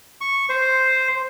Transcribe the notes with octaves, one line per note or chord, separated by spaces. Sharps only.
C#6
C5